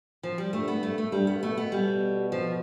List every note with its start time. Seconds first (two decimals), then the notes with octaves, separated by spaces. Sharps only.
0.23 F3
0.38 G3
0.53 G2 A3
0.68 B3
0.83 A3
0.98 A3
1.12 G2 G3
1.27 B3
1.42 B2 A3
1.57 B3
1.72 B2 G3
2.32 F3